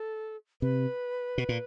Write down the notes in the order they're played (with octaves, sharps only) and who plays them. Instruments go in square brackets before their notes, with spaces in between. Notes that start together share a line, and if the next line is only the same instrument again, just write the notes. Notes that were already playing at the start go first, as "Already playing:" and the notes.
Already playing: [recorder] A4
[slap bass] C3 [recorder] B4
[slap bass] B2
A#2